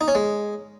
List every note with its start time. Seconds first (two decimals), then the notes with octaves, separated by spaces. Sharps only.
0.01 D#4
0.08 C#4
0.15 G#3